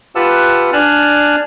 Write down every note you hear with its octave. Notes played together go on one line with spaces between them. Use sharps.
F4 G4 B4 F#5 A5 E6
D4 G#5 A5 F6 F#6